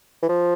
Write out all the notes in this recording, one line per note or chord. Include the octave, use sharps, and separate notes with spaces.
E3
F3